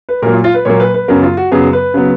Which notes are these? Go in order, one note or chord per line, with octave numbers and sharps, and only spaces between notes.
B4
A#2 F#3 A#3 A#4
F4
F4
B4
A#2 F#3 A#3 C#5
B4
B4
F#2 C#3 F#3 B3 A#4
F4
F#4
F#2 C#3 F#3 B3 G#4
B4
C#3 F#3 B3